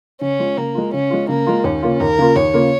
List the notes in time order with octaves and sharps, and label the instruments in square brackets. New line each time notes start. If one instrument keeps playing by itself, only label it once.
[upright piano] C#3 [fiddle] C#4
[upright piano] G#3 F4
[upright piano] C#3 [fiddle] A#3
[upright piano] G#3 F4
[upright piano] C#3 [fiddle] C#4
[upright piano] G#3 F4
[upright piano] C#3 [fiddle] A#3
[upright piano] G#3 F4
[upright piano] D#2 [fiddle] C#4
[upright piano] C#3 A#3 F4
[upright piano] D#2 [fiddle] A#4
[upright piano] C#3 A#3 F4
[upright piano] D#2 [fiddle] C#5
[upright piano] C#3 A#3 F4